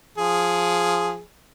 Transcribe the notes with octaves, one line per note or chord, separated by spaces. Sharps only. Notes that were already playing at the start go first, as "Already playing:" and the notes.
F3 G#4